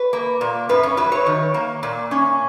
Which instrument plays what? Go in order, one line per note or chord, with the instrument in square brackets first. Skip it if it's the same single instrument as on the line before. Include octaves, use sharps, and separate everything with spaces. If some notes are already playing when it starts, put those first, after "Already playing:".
Already playing: [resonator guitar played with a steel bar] B4
A#3
A#2
F#2 B4
C#4
F#3 B4
C#5
D#3
A#3
A#2
C#4